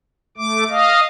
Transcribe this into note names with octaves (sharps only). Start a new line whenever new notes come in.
A3 D6
D#5 F5